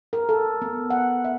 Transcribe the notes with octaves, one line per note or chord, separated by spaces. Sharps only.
A#4
A4
B3
F#5
E5